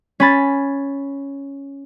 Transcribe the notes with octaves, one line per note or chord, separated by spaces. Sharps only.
C#4 B5 A6